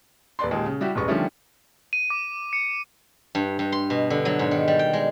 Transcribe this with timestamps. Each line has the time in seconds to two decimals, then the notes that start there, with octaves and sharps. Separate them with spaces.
0.39 D#1 B4 D5 C6
0.51 D#2 A#2 G#3
0.66 C#3
0.81 G3 E4 F#4 G4
0.95 E1 A1 B3 C#6
1.08 D3 D#3 F3 G3 A3 C#4
1.93 D#7
2.10 D6
2.53 C#7
3.35 G2
3.59 G2
3.72 C6
3.90 B2
4.10 D3
4.25 F#3
4.39 G#2
4.51 D#3
4.68 G3
4.79 G5
4.93 G#3